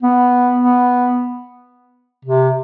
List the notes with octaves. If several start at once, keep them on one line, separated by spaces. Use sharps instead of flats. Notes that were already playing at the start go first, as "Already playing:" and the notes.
B3
B3
C3